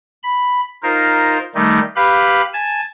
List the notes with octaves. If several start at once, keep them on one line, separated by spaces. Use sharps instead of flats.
B5
D#4 F4 A#4 C5
D#3 G3 A3 D#4
G4 B4 F5 B5
G#5 A5